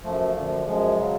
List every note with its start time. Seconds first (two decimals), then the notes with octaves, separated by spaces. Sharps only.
0.04 F#2 F3 A3
0.36 F#2 D3 F3
0.67 F#2 F3 G#3
0.98 C#3 F#3